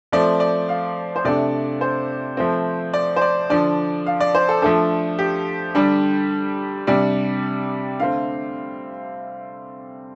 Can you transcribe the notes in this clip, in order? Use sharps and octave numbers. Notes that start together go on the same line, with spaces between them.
F3 A3 C4 D5
D5
F5
C5
C3 A3 D4 D5
C5
F3 A3 C4
D5
C5
D5
D3 F3 D4 D5
F5
D5
C5
A4
F3 A3 D4 A4
G4
D3 G3 D4
C3 G3 D4 D5
D3 A3 C4 F5